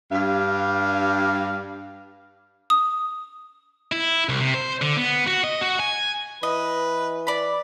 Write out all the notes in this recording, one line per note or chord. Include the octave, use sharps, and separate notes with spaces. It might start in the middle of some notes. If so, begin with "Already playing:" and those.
G2 F5
D#6
E4
C2
C3
C5
D3
B3
F#4
D#5
F#4
G#5
E3 B4 D#5
D5 B5